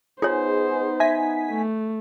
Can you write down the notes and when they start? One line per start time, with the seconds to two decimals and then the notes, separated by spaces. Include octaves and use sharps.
0.22 B3 D#4 F4 G#4 C5 C#5
1.00 E5 G#5 B6
1.50 A3